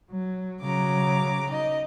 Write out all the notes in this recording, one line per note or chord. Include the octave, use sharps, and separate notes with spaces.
F#3
C#3 F#3 A#5 D6
D#4 D#5